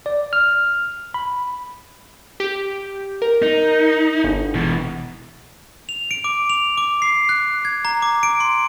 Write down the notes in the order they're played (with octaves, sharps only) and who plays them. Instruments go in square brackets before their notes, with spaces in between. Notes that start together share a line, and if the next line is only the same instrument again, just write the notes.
[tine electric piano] D5
F6
B5
[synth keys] G4
A#4
[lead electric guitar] D#4
[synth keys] G1
[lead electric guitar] B2 E3
[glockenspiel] F7
D7
D6
F7
D6
C7
F#6
G#6
A#5
D6
D7
C6